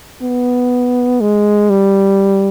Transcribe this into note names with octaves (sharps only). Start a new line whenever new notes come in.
B3
G#3
G3